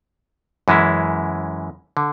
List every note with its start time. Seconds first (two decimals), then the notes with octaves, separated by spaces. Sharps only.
0.68 F#2 E3 G#3 C#4 E4
1.97 D3